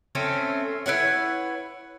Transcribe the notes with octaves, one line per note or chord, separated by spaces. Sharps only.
A3 C4 C#4
E4 B4 C#5 F#5